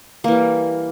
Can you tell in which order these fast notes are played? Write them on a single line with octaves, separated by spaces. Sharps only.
A#3 E3 G3